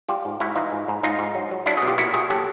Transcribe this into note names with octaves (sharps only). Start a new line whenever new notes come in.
G3 F4 G4
G#2
G#2 E4 F#4
E3 D#4 F4
G#2
G#2
G#2 D#4 F4
G#2
F#3
F#3
F#3 D4 E4
F#4 G#4
B2
F4 G4
A#2 E4 F#4
A#2 F#4 G#4
F#3 G4 A4